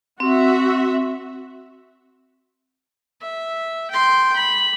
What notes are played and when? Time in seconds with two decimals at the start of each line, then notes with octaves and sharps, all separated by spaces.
0.20 C4 F#4 E5
3.22 E5
3.91 G5 C6
4.36 B5